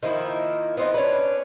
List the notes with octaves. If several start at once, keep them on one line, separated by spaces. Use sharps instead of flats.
D#3 F3 A#3 E4
B3 C4 D#4
C#4 D4 B4